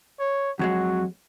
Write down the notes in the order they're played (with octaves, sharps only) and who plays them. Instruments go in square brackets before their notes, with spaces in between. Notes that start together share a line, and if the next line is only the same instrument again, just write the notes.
[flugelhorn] C#5
[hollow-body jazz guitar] F2 F#3 G#3 [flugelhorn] F#4